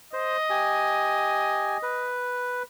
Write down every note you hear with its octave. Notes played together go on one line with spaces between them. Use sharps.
C5 D#5
G4 G#5
B4